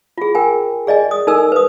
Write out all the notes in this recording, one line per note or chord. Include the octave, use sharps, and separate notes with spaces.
F4 G#4
A#4 G5 G#5
G#4 D5 D#5 G#5
D#6
D#4 A4 A#4 G#5 E6
B4 D#6